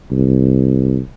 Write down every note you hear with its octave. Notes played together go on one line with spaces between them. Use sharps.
C2